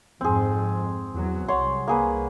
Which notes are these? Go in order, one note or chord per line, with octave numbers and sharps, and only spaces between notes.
F2 G#2 C4 G#4
E2 F#3
C2 C#5 F#5 C6
A#3 G#4 B4